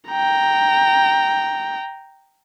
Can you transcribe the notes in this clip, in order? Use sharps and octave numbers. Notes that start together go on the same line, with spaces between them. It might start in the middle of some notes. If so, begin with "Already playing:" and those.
G5 A#5